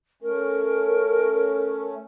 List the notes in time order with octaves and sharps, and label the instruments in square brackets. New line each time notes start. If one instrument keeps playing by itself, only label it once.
[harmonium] A3 C#4 [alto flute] A#4